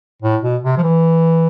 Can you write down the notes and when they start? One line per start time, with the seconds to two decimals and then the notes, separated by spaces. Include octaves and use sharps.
0.22 A2
0.43 B2
0.64 C3
0.77 F3
0.83 E3